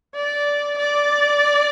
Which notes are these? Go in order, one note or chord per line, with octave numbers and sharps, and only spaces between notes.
D5
D5